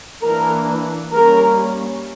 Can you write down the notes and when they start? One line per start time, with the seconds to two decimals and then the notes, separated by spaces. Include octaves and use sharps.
0.24 E3 A#3 D4 A#4
1.13 G3 A#3 C#4 A#4